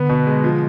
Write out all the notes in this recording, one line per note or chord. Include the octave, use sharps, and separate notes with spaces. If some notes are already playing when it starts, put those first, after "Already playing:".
Already playing: D3 B3
B2
G#3
F3